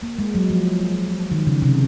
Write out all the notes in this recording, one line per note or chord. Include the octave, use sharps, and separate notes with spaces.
A#3
G#3
F#3
F3
D#3
C#3
C3